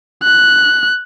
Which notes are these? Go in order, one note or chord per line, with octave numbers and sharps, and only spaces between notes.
F#6